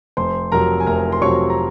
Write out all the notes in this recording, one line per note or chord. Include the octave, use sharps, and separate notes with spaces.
F1 C5 C6
F2 C3 F#3 A#4 A#5
G#5
F1 A#4 A#5
C6
F2 C3 F#3 C#5 C#6
A#5